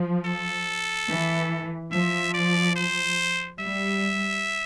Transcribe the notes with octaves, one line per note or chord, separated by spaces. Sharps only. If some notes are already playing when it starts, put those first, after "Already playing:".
Already playing: F3
A4
E3
F3 E5
D5
C5
G3 E5